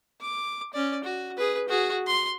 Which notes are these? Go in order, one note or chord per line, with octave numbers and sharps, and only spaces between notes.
D6
C#4 D5
F#4
G#4 B4
F#4 G#4
C6